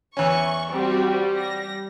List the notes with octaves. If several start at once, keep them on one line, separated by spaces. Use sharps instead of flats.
E2 E3 C#4 C#6
G3 C4 F#4
A#6